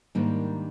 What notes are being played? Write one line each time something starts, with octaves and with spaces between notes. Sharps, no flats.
G#2 D#3 G3 A#3 D4